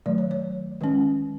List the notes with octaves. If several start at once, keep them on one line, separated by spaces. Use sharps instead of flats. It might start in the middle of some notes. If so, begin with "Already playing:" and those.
D#3 F#3 A3 D5
C#5
C#5
D#3 G#3 C#4